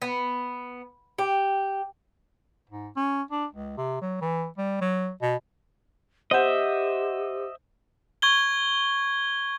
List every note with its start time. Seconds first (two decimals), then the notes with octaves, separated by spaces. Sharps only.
0.02 B3
1.18 G4
2.69 G#2
2.96 C#4
3.31 D4
3.53 C#2
3.78 C3
4.02 F#3
4.21 E3
4.58 G3
4.81 F#3
5.22 B2
6.31 G4 C5 D#5 E5 F#5 G6
8.22 C#6 G#6 G7